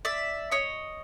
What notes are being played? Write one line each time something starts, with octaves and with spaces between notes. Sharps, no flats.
D5 E5
C#5 D#5